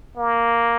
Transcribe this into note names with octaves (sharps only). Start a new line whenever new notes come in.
A#3